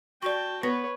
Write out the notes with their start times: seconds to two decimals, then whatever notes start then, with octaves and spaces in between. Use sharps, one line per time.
0.22 F#4 D5 G5 A5 C#6
0.63 B3 B4 C#5 A#6